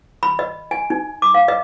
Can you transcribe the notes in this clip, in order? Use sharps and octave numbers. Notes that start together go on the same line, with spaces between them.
B5
D#5
G#5
D#4
D6
F5
D#5